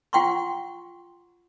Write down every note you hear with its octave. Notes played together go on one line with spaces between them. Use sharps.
F4 F#5 G5 C6 C#6